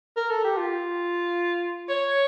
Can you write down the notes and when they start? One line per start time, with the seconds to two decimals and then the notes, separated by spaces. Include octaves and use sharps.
0.16 A#4
0.30 A4
0.44 G4
0.57 F4
1.89 C#5